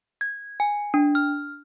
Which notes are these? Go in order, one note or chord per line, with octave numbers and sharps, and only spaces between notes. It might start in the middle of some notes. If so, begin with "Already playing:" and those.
G#6
G#5
D4
F6